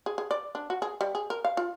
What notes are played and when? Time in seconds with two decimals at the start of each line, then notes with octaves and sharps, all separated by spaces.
0.06 G#4
0.18 G#4
0.31 D5
0.55 D4
0.70 F#4
0.82 G#4
1.01 G3
1.15 G#4
1.30 A#4
1.45 F5
1.57 F4